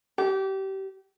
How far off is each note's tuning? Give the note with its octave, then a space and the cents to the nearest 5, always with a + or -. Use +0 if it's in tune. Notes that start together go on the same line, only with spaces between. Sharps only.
G4 -25